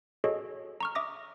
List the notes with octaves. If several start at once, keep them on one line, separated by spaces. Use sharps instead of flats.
F#4 G#4 A4 C#5 D#5
A#5 C#6 F6
E5 D6 D#6 A#6